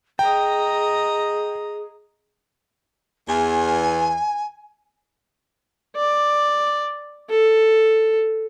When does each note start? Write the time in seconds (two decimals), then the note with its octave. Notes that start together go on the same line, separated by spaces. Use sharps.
0.19 G#4 D#5 G5 A#5
3.28 E2 G#5
5.96 D5
7.30 A4